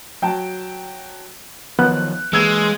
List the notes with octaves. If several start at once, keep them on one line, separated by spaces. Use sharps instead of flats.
F#3 G5 A5
D#3 F3 F#3 B3 F#6
E3 G#3 A#3 E6 G#6